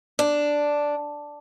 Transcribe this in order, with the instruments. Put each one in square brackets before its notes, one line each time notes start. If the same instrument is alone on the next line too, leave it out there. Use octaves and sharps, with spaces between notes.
[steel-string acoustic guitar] D4